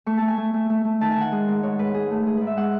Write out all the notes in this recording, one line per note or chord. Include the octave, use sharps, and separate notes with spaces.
A3 C#6
A3 A5
G#5
A3
A3
A3
A3
D#3 A5
D#3 G#5
F#5
G#3
G#2
G#2 C#5
G#2 B4
G#2 G#4
A3
G#2 G#4
G#2 B4
E5
G#3 F#5